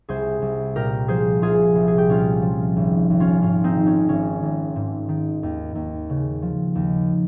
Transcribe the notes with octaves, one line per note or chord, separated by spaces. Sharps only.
C2 G#4 C5
C2
A#2 G4 A#4
F3 G#4 C5
C2 F4 G#4
C2
G#4
G4
A#2 C#4 F4
F3
G#1
G#1
C#4 F4
G#2 C#4 F4
C4 D#4
D#3
C#4
G#1 C#4
G#1
G#2
D#3
D#2
D#2
C#3
F3
D#2